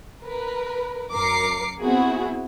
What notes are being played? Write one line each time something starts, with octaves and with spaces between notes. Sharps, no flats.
A#4 B4
F#2 A#4 D6 C7 C#7
B3 C4 E4 F#4 G#4